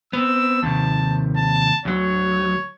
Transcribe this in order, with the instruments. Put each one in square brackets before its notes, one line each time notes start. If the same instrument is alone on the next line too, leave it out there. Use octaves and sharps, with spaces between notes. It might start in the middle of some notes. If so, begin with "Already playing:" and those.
[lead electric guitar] B3 C4 [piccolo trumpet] E6
[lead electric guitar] D#2 C3 [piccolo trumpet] A5
[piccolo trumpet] A5
[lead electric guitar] D2 F#3 [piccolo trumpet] C#5